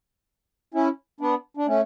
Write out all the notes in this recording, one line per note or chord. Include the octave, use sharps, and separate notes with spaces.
C#4 E4
B3 D4
D4
A3 C#4